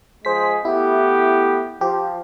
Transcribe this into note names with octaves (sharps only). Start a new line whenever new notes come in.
F3 G#3 G#4 C5 B6
A3 B3 E4 G4
F3 G4